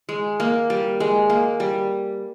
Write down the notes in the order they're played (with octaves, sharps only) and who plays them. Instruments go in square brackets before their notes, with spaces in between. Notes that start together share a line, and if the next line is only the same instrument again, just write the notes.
[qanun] G#3
A#3
G3
G#3
A#3
G3